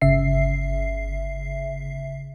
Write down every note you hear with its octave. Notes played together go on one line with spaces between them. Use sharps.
G1 C#3 E5 C7